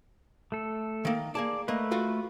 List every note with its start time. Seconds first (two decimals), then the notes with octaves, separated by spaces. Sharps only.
0.52 A3 A4
1.05 D#3 A#3
1.35 A#3 G#4 D5 A5
1.68 A3 A#3 B4 D#5
1.91 F4 F#4 A4